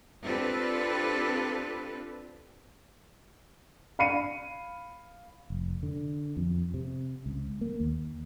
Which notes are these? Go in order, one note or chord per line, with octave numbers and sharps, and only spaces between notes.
C4 D4 F4 G4 A4 B4
F5 B5 C7 C#7 D#7
F1
D3
F2
C3
C#2
A#3
D#2